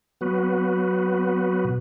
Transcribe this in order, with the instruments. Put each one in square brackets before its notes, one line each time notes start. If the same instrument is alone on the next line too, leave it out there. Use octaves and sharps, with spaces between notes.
[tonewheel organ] F#3 B3 F#4 B4
B2